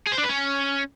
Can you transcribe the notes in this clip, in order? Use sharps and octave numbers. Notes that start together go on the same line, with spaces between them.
G#4
C5
D4
B4
C#4